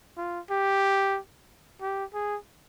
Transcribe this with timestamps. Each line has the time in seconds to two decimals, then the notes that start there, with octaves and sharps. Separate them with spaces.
0.17 F4
0.50 G4
1.82 G4
2.14 G#4